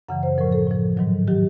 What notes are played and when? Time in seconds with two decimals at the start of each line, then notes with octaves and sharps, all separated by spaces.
0.09 F#2 C#3 E3 F#5
0.23 C5
0.38 A2 F3 A#4
0.52 A4
0.67 A2 F3
0.97 G#2 D#3 F#3
1.28 D#3 F#3 G4